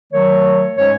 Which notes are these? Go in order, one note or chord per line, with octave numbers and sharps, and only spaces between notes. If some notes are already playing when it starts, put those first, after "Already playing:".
D#3 F#3 A3 C#5
G#2 G#3 C#4 C#5